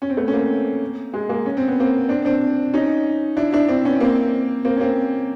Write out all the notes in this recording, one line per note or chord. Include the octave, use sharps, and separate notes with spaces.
C#4
C4
A3 B3
C#4
A#3 C4
G#3
G#3 A#3
C#4
C4
B3
A#3 C4
C4 D4
C4 D4
C#4 D#4
D4 E4
D4 E4
C4 D4
B3 C#4
A#3 C4
A#3 C4
C#4
A#3 C4